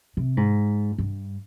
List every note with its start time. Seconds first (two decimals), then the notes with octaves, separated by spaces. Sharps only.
0.17 C3
0.37 G#2
0.98 G2